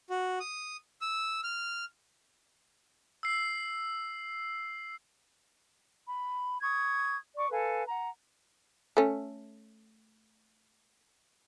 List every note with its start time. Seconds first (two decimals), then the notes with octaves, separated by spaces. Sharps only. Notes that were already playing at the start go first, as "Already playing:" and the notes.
0.10 F#4
0.40 D#6
1.01 E6
1.44 F6
3.23 E6 C7
6.07 B5
6.62 C#6 D#6 G#6
7.36 D5 C#6 D6
7.51 A4 B4 F5 G#5
7.88 F#5 A#5
8.97 A3 C#4